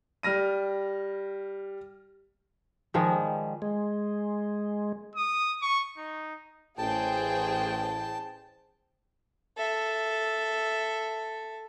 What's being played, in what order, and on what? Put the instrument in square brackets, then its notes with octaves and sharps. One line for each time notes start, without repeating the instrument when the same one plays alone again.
[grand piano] G3 F6 A#6 D#7
[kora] D#3 F3 G3 G#3
[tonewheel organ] G#3
[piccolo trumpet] D#6
C#6
D#4
[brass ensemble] A1 [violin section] G#4 C5 G5 [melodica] A5
[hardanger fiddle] A4 E5